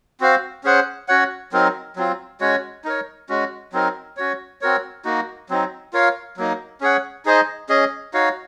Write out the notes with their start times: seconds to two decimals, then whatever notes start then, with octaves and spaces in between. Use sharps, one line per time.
0.20 C4 F#4 C5 F5
0.64 C#4 G#4 C5 F#5
1.08 C#4 F#4 C#5 F#5
1.52 F#3 C4 D#4 A#4
1.96 F#3 C4 F4
2.41 G#3 C#4 F#4 C#5
2.84 D#4 A#4 C#5
3.29 G#3 C#4 F#4
3.73 F#3 C4 D#4 A#4
4.17 C#4 F#4 C#5
4.61 C4 F#4 A#4 C#5
5.05 A#3 D#4 F#4
5.49 F#3 C4 D#4
5.93 F4 A#4 C#5 F5
6.37 F#3 A#3 D#4
6.81 C#4 G#4 C#5 F#5
7.26 D#4 G#4 C5 D#5
7.69 C#4 G#4 D#5
8.14 D#4 F#4 C#5 F5